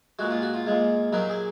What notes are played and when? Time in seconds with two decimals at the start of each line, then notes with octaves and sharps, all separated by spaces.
0.19 A#2 G#3 F#4
0.31 F4
0.42 F#4
0.54 F4
0.66 A#2 G#3
1.13 A#2 F#3 A#3 D#4
1.30 G#4